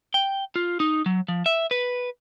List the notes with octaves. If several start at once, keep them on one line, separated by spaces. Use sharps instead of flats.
G5
F4
D#4
F#3
F3
E5
B4